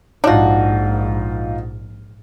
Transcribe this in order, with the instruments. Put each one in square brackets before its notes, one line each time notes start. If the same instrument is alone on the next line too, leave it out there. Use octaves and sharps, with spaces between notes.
[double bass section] A#1 G#2 [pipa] D4 F#4 [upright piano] D#4 F4